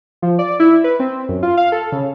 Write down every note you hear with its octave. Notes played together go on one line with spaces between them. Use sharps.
F3
D5
E4
B4
C4
F#2
F4
F5
A4
C#3